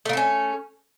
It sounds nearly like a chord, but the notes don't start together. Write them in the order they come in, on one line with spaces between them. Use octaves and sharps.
A3 A#3 C4 C#4